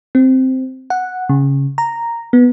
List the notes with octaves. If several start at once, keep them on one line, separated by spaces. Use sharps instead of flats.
C4
F#5
C#3
A#5
B3